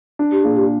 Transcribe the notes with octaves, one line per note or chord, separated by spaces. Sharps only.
D4
G4
A#2 G#4
G4